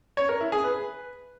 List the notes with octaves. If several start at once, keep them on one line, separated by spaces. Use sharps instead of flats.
C#5
A#4
E4
G#4
B4